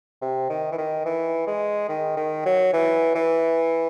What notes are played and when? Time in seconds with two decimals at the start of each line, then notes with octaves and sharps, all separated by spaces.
0.22 C3
0.50 D#3
0.72 E3
0.78 D#3
1.05 E3
1.47 G#3
1.89 D#3
2.17 D#3
2.46 F#3
2.73 E3
3.15 E3